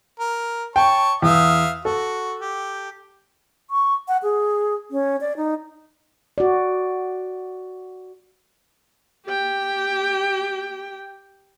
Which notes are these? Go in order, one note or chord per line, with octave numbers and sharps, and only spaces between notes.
A#4
C#5 G5 A5 C#6
E2 E5 F5 D#6
F#4 A4
G4
C#6
F#5
G#4
C#4
D5
D#4
F#4 D5
G4 G5